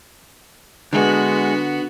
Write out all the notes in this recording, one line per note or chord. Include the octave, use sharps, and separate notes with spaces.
D3 G#3 B3 F#4